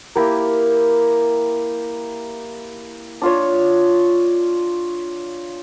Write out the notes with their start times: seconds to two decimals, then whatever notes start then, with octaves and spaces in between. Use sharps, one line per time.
0.15 A#3 E4 G4 A#4
3.22 D4 F4 C#5